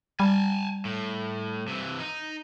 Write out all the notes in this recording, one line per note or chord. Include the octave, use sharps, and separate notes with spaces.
G3 G#5 A5
A2
C3 E3
D#4